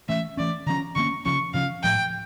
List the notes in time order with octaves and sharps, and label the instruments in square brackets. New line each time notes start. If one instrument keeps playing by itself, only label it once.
[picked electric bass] E3 A3 C#4 [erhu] E5
[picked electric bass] E3 A3 C#4 [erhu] D5
[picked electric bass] D3 F3 A#3 C#4 [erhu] A#5
[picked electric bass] D3 F3 A#3 C#4 [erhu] C#6
[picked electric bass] C#3 F3 C#4 [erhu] C#6
[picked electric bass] C#3 F3 C#4 [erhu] F5
[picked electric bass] A2 F3 A3 [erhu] G5